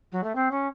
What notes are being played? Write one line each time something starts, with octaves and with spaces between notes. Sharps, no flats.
F#3
A3
C4
C#4